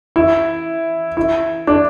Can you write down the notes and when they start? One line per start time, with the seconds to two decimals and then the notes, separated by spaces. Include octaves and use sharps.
0.16 E4
1.17 E4
1.67 D4